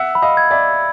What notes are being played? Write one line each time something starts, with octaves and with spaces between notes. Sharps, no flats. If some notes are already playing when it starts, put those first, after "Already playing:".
Already playing: E5 F#5 E6
B5
D#5 F5
G#6
D5 E5
E6